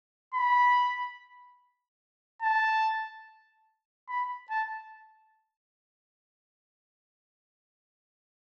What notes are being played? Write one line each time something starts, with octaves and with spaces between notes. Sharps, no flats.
B5
A5
B5
A5